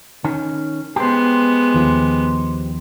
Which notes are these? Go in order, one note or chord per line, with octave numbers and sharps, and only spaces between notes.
D#3 C#4
G#3 B3 G4 C5
D#2 D#3 F3